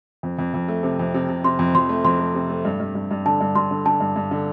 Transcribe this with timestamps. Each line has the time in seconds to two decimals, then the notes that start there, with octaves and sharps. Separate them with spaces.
0.23 F2
0.38 F2
0.54 F2
0.68 A3
0.83 C3
0.99 F2
1.14 C3
1.28 C3
1.44 C3 C6
1.59 F2
1.75 F2 C6
1.89 A3
2.04 F2 C6
2.19 A3
2.35 C3
2.50 A3
2.65 G2
2.80 G2
2.95 G2
3.11 G2
3.25 D3 A5
3.41 G2
3.55 G2 C6
3.71 D3
3.86 D3 A5
4.00 G2
4.16 G2
4.31 D3